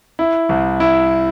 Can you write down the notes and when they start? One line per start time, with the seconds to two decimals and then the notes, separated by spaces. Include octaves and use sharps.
0.19 E4
0.49 C2
0.80 E4